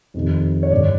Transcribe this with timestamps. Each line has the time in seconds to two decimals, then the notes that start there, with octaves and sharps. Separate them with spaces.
0.14 F2 C3 D#3
0.63 C#5
0.71 G2 D3 D5